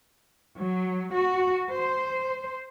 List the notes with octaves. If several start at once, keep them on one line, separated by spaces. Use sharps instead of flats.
F#3
F#4
C5